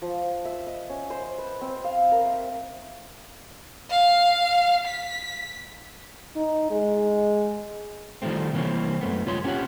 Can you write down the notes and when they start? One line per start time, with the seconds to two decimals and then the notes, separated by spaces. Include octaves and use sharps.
0.02 F3
0.45 E5
0.67 D#5
0.89 C#4
1.10 C5
1.38 B4
1.61 C4
1.84 F5
2.12 A#4
2.26 E5
3.90 F5
4.87 B6
6.36 D#4
6.71 G#3
8.22 D#3 F3 G3 A3 C4
8.53 C2 E3 A#3 C4 C#5
9.01 F#2 A3 B3
9.26 C2 F4 C#5 B5 C6
9.44 B3 C#4 F4 G4 C#5 F#5